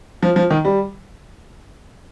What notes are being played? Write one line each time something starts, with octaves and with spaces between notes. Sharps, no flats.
F3
F3
D#3
G3